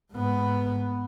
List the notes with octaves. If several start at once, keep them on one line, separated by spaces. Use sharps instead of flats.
G#2 B3